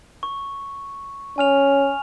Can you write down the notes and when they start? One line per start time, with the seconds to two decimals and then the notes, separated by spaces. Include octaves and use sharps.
0.23 C#6
1.38 C#4 G#5 F6 F7